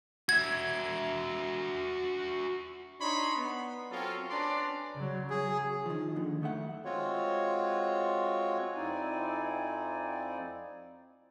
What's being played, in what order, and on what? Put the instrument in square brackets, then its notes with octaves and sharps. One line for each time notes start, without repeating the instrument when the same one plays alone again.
[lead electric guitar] F#4 E5 [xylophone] G#6
[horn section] D4 D#4 C#5 B5 C6
B3
F#3 C4 C#4 F4 A4 A#4
C#4 D4 B4 D5 A#5 C6
[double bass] C#3 F#3
[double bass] F#3 [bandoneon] G#4
[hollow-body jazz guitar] D#3 F3
D#2 D3 D#3
F#2 D#3 A3 E5 F#5
[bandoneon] G#3 C4 F4 F#4 C#5
[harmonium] F2 C4 D#4 E4 D5 G#5